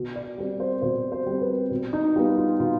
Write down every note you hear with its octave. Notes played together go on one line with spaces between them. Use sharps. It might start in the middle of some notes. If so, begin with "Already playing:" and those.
Already playing: B2
D5
G3 C4
C5
B2 C5
C5
G3 C4
B4
B2
D#4
G3 B3 F4
F4
B2 F4